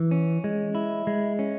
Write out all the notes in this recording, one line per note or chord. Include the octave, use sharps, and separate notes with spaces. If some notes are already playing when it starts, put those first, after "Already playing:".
Already playing: E3
C#4
G#3
E4
G#3
C#4